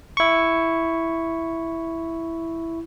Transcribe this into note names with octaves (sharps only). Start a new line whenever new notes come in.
E4 C#6